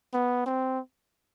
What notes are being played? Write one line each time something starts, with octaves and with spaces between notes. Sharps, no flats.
B3
C4